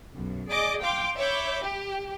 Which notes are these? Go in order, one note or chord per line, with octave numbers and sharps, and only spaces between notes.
B1 F#2
G#4 D5 D#5 D6
F5 G5 C6 D6
C#5 E5 B5 D6 G6
G4